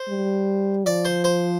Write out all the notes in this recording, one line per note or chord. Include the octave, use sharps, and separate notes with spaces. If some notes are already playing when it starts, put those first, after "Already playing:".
Already playing: C5
G3
F3 D5
C5
C5